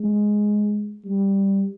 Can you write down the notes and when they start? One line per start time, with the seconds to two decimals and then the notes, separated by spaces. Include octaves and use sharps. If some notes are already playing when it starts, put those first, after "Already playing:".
Already playing: G#3
1.04 G3